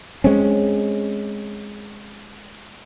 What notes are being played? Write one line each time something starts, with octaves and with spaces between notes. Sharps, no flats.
G#3 C4 C#4